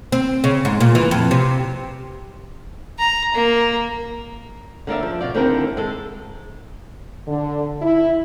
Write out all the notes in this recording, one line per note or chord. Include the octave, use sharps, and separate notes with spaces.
C4
C#3
G#2
A#2
E3
F2
C3
A#5
A#3
D3 A#3 D5 E5
F3
B2 F4 D5
D#2 D3 C4 D4 E4 A#4
G#3 A4
D3
E4